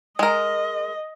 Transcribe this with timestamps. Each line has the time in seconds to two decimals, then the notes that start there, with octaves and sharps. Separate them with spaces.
0.19 G#3 A#4 D#5